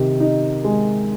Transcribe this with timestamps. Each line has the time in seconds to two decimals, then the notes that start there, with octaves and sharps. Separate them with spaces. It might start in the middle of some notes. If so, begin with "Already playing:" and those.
Already playing: C3 D#3
0.20 D#4
0.64 G#3